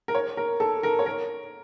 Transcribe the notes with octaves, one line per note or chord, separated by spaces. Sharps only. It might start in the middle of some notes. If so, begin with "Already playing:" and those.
A#4
C#5
A#4
A4
A#4
C#5
A#4